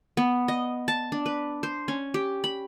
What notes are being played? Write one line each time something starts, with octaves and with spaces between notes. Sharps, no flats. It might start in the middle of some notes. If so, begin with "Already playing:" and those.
B3
D#5
A5
D4
B4
C5
C#4
G4
B5